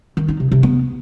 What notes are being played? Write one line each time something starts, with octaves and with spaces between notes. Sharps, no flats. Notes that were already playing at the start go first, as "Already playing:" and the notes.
D#3
D#4
C3
C3
B3